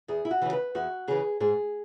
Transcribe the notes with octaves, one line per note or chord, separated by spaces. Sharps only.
E2 G#4
E4
F#4
C#3 E3
B4
E2 F#4
C#3 E3 G#4
G#2 G#4